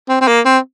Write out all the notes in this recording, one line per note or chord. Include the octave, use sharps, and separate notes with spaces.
C4
C4
A#3
C4